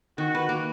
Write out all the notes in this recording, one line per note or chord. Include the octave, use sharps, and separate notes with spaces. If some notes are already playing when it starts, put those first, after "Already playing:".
D#3 F#4
B4
A#3